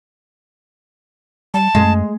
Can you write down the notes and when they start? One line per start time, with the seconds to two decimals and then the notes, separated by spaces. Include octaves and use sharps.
1.54 G3 A5
1.75 F#2 G#3